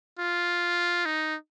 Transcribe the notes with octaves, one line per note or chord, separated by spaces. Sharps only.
F4
D#4